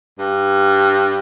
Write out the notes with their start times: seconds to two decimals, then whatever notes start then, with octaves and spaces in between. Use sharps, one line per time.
0.19 G2